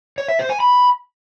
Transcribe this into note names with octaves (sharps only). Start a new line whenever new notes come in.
C#5
E5
C5
G#5
B5